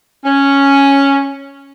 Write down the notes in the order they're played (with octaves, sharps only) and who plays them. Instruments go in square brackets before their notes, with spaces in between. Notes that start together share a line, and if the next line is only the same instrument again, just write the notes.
[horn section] C#4